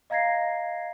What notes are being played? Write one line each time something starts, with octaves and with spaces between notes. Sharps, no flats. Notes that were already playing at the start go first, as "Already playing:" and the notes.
D#5 F5 A#5 G#6 A#6 C7